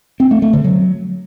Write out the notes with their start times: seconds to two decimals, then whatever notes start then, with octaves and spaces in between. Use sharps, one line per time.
0.20 C4
0.31 A3
0.42 A3
0.53 D3
0.64 F#3